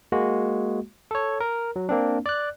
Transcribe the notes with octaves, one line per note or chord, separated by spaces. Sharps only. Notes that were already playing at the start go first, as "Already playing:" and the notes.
G#3 A#3 F#4
A4 C#5
A#4
F#3
A#3 C4 D4
D5 F#6